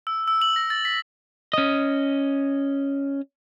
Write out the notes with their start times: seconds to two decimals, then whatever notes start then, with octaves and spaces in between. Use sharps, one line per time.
0.07 E6
0.28 E6
0.42 F#7
0.56 A#6
0.70 A6
0.85 B6
1.53 C#4 D#5